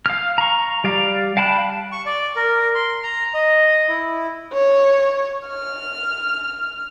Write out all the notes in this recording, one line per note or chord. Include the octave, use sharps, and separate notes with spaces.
F5 F6
A#5 C#6
G3 D5 F5
F5 G5 A5 B5 F#6
C#6
D5
A#4
C6
A#5
D#5
E4
C#5
F6